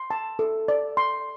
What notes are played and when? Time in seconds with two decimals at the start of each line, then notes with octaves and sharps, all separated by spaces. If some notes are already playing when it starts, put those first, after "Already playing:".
Already playing: C6
0.11 A5
0.39 A4
0.68 D5
0.97 C6